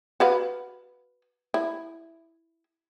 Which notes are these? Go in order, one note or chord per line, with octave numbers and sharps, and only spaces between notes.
F#4 B4 F5
E4